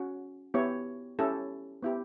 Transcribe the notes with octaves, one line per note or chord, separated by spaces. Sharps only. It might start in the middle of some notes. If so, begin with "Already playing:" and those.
Already playing: C#4 F#4
B3 E4 G4 C#5
C#4 E4 G4 A4
B3 E4 G4